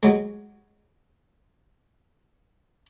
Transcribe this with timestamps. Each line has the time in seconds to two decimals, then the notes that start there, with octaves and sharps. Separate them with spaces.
0.03 F#3 G#3